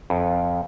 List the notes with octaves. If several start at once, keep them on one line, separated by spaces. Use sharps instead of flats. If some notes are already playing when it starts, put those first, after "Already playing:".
F2